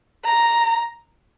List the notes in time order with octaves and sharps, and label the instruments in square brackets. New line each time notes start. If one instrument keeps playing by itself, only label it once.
[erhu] A#5